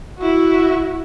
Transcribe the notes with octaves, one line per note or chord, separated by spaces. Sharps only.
E4 F#4